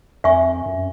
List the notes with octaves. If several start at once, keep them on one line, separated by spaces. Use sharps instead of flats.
F2 E5 G#5 C#6
F#2